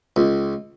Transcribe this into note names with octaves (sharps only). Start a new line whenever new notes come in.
C#2